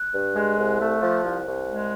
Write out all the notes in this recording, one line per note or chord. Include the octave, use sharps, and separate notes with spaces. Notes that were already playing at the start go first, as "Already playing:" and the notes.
Already playing: F#6
G2
G#3
C2
A3
F3
C2
C2
G#3